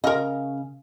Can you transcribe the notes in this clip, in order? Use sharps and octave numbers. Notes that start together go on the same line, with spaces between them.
C#3 A#4 D#5 F5